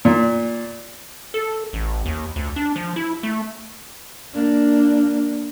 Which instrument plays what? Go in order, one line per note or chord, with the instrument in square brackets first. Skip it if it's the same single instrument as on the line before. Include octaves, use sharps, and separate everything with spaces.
[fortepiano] A#2
[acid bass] A4
A1
D#2
D2
D4
F3
E4
A3
[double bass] A#3 D4